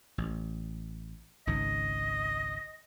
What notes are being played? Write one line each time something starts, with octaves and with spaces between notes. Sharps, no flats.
A1
G#1 C#2 G#2 D#5